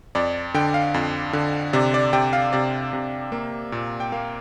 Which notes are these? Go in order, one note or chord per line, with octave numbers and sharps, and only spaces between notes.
F2 D5
D3 G5
F5
F2
D3
C3 D5
D5
C3 G5
F5
C3 D5
C3
A#3
A#2
G5
A#3 F5